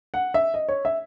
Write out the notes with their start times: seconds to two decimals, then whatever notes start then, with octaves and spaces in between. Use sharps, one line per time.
0.14 F#5
0.34 E5
0.54 D#5
0.69 C#5
0.85 E5